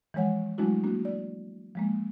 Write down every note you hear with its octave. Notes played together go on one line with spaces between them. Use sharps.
E3 F3 G#3 C#5 F#5
F#3 G#3 A3 D4 E4 F#4
A#3 D4 F#4
D5
F3 G#3 A#3